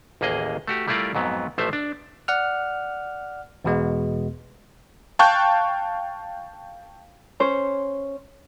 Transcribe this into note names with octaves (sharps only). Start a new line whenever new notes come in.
A1 D#2 A#3 G#4 D#5
A3 F#4 G4
G3 A3 E4 F4 A#4 D5
F2 G#2 F#3 B3
A1 F3 A3 C5 E5
D4
D5 F#5 F6
E2 B2 G#3 B3
F5 G5 A5 C#6 F#6 G6
C#4 C5 C#5